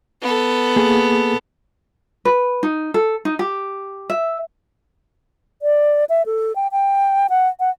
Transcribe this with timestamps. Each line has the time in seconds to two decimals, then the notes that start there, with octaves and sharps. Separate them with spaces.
0.22 B3 A4
0.76 A#3 G#4
2.25 B4
2.63 D#4
2.94 A4
3.25 D#4
3.39 G4
4.10 E5
5.62 D5
6.09 E5
6.26 A4
6.56 G5
6.72 G5
7.30 F#5
7.60 F#5